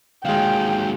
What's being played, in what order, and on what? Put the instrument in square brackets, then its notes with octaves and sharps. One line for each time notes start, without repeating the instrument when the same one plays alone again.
[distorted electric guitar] D#2 F#3 [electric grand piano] G#3 F5 [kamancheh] G5